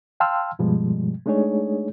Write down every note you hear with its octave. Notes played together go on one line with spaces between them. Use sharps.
F5 G5 A5 C6 E6 F6
G2 B2 F3 G3 G#3
G#3 A3 D4 D#4 G#4 C#5